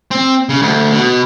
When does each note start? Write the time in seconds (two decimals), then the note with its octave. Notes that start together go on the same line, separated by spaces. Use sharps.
0.11 C4
0.49 C#3
0.62 D2
0.92 B2